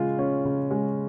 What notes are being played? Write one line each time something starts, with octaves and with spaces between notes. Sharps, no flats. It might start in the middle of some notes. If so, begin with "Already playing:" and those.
Already playing: C#3 G#3 F4
C#4
C#3
G#3